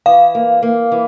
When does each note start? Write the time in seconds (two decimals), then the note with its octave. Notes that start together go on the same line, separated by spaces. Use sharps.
0.06 E3 F5
0.35 A#3
0.62 A#3
0.92 E3